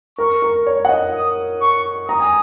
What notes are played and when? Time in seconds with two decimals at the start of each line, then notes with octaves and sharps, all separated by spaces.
0.18 A#4 C#6
0.42 A#4
0.67 C#5
0.85 F#5
0.89 D#5
1.14 D#6
1.61 C#6
2.09 A#5 D#6
2.20 G#5